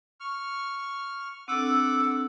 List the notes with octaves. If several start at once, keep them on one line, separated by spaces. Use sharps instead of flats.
C#6 F6
C4 D4 A4 F#5 D6 E6